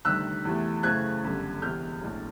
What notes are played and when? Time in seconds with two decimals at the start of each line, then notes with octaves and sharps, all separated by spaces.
0.05 D2 C3 D#3 G3 E6 F#6
0.45 E2 C3 E3 A3
0.83 F#2 C#3 E3 A3 C4 F#6 G#6
1.23 G1 F#2 D3 G3
1.62 E1 E2 C3 F6 G6
2.01 A#1 A2 F#3